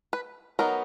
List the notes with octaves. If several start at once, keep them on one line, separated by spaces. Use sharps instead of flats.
B4
F#3 B3 D#4 A#4